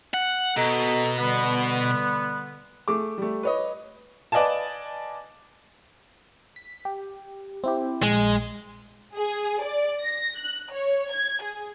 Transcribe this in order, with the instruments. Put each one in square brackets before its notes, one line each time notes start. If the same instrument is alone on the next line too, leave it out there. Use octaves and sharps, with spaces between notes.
[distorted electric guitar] F#5
[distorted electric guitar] B2 [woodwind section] A4 D#5 A#5
[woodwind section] D3 G3 B3
[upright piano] A3 G#4 D6
G3 A3
B4 C#5 D#5
[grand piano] B4 D5 D#5 F5 G#5 A5
[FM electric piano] B6
G4
C4 E4 G4
[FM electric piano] A#1 [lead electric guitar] G#3
[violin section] G#4
D5
A#6
F#6
C#5
G#6
G#4